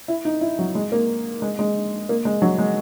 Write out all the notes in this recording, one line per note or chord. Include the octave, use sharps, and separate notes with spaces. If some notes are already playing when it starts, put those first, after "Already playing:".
E4
D#4
E4
F#3
G#3
A#3
G#3
G#3
A#3
G#3
F#3
G#3